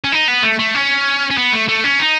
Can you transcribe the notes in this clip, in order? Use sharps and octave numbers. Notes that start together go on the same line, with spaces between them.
C#4
D#4
B3
A3
A3
C#4
C#4
B3
A3
A3
C#4
D#4